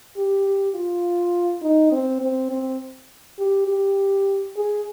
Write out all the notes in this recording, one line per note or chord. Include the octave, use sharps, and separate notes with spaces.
G4
F4
D#4
C4
C4
C4
G4
G4
G#4